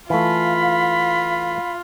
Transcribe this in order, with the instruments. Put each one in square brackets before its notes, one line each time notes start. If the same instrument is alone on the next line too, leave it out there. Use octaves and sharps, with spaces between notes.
[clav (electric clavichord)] E3 A3 [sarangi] F4 [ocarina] F5 [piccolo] B5